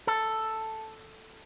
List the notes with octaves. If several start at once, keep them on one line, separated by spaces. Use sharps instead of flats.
A4